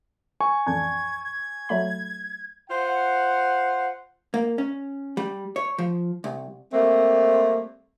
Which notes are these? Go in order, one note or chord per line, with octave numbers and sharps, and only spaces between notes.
G#5 C#6
A1 F2 D4 G#6
G#6
F#3 A3 B5
F4 C5 F#5
A#3
C#4
G3
C#5
F3
C2
G3 A3 A#3 C4